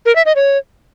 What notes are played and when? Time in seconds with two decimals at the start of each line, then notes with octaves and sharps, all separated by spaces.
0.06 A#4
0.16 E5
0.26 D#5
0.36 C#5